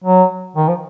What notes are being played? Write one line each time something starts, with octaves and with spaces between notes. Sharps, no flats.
F#3
D#3
F3